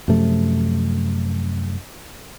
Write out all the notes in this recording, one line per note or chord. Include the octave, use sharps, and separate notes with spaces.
F#2 C3 F3 A3